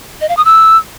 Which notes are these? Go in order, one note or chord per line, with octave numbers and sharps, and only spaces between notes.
D#5
F5
D#6
E6